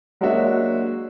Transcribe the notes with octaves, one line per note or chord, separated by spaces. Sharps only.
F#3 G#3 A#3 D4 F#4 E5